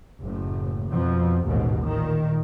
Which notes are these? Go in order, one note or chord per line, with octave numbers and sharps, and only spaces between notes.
F#1 A2
F2 B2 F3
A1 D#2 G#2 B2
A#2 D#3